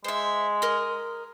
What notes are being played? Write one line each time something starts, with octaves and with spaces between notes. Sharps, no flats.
G#3 C5 E5
A#4 D#5